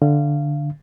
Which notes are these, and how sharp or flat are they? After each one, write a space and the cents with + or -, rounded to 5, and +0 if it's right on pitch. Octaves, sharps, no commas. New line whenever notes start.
D3 +0 F5 -25